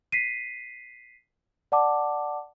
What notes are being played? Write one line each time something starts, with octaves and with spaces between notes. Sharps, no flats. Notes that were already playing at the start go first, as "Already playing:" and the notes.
B6 C7 D#7
D5 F#5 A5 D6